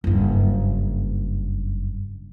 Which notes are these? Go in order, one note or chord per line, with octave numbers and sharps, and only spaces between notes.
F#1 G2